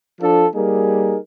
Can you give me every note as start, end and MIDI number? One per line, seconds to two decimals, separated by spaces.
0.21 0.45 53
0.21 0.45 62
0.21 0.45 65
0.21 0.45 69
0.53 1.16 55
0.53 1.16 58
0.53 1.16 63
0.53 1.16 68
0.53 1.16 70